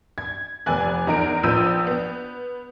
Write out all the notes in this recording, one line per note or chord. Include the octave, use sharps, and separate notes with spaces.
G#6
F1 B3 D5 G#5 F#6
E2 D#4 A#4 D7
A#1 F3 B3 E6 G6 D#7
B3